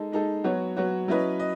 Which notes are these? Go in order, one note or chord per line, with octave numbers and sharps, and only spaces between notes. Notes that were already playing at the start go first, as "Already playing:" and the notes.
Already playing: G#3 D#4 A4
G#3 D#4 A4
F#3 B3 F#4 C#5
F#3 B3 F#4 C#5
F#3 C#4 E4 B4 D#5
D#5